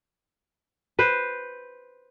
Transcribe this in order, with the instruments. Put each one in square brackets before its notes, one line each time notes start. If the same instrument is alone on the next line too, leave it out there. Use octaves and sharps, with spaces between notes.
[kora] B4 C5